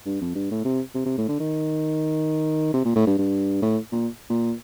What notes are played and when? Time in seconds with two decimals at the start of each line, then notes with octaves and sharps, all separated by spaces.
0.06 G2
0.21 F2
0.35 G2
0.51 A2
0.65 C3
0.95 C3
1.06 C3
1.17 A2
1.28 D3
1.40 D#3
2.73 C3
2.85 A#2
2.96 A2
3.07 G2
3.18 G2
3.62 A2
3.92 A#2
4.30 A#2